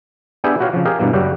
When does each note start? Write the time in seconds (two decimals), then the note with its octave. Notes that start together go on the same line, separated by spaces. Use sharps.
0.44 B3 D4 G4 G#4 E5 G5
0.60 F#4 G4 C#5 F5
0.73 C#3 F3
0.85 G4 G#4 A#4 D#5 F5
1.00 G2 B2 E3 A#3
1.13 F#2 C#3 G3 F#4 G4